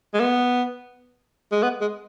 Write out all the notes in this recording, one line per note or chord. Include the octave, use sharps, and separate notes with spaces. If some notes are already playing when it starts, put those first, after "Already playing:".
G#3
B3
G#3
B3
G#3